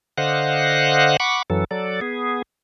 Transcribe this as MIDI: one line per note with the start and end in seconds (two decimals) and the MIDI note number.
0.18 1.17 50
0.18 1.17 72
0.18 1.17 75
0.18 1.17 77
0.18 1.17 78
0.18 1.17 90
1.20 1.42 78
1.20 1.42 83
1.20 1.42 85
1.20 1.42 86
1.50 1.64 42
1.50 1.64 52
1.50 1.64 54
1.50 1.64 69
1.71 2.00 54
1.71 2.00 69
1.71 2.00 74
2.01 2.42 59
2.01 2.42 68